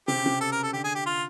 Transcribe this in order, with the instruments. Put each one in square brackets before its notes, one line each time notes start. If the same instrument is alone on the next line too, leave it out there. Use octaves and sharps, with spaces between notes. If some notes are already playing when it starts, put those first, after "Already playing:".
[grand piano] C3 [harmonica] G4
[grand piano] C#3
C3
[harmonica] A4
A#4
A4
[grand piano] D3 [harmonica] G4
[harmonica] G#4
G4
F4